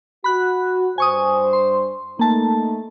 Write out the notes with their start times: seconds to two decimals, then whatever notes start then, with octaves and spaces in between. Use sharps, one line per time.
0.24 F#4 B5 F#6
0.98 G2 C5 G#5 C#6 D#6
1.53 C6
2.19 A3 A#3 D#4 A5